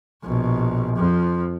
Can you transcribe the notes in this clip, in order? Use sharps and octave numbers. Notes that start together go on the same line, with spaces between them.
A#1 B2
F2 F3